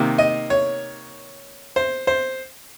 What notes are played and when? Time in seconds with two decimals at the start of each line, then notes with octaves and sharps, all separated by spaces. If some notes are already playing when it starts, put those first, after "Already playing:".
Already playing: C3 D#3 A#3
0.18 D#5
0.50 C#5
1.76 C5
2.07 C5